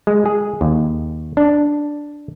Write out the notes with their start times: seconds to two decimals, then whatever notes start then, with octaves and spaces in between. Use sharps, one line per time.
0.07 G#3
0.26 G#4
0.61 D#2
1.37 D4